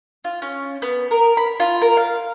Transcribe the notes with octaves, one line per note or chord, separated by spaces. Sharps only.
F4
C#4
B3
A#4
B5
F4
A#4
F5